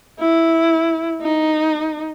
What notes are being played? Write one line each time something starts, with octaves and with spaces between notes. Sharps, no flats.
E4
D#4